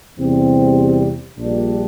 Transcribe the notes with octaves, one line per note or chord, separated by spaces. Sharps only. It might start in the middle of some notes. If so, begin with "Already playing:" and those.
E2 C3 G3 C4
A#1 A#2 G3 D4